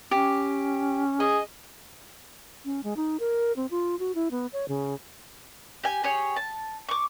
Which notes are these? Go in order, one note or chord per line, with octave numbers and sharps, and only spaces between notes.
C#4 G4
G#4 D#5
C#4
G#3
D#4
A#4
C4
F4
F#4
E4
B3
C#5
C#3
G4 G#5
G4 G#4 C#5
A5
C#6 D6